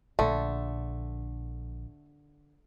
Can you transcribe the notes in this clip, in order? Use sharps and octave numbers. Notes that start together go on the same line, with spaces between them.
A#1 D3 A3